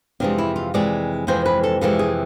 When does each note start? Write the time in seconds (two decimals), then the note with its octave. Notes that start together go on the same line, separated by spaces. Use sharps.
0.20 F2 C3 E3 G#3 D4
0.38 E4
0.56 F4
0.74 F2 C3 E3 G#3 D5
1.27 F2 C3 E3 G#3 C5
1.46 B4
1.63 A4
1.81 F2 C3 E3 G#3 A4
1.99 G#4